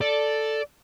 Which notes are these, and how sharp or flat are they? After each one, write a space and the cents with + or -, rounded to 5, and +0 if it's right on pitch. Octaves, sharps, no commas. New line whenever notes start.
A4 +0 D5 +0